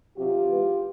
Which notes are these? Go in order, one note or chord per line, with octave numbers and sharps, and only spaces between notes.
C3 D#3 F#3 F4 G4
E3 G#3 B3